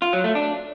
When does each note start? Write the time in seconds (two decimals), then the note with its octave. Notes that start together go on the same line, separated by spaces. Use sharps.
0.02 F4
0.13 F#3
0.24 A3
0.35 D4